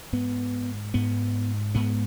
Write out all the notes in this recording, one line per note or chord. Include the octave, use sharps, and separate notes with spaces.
G#2 B3
G#2 B3
G#2 B3